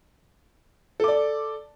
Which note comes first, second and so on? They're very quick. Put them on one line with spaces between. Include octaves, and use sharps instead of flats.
A4 D6 D5